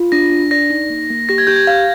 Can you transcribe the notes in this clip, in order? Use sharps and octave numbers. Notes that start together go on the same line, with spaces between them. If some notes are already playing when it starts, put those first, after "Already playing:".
Already playing: F4
D4 A#6
D4
D5 A#6
D#4
A#3
A#3
G4 A#6
G#6
G4 G6
G#6
F5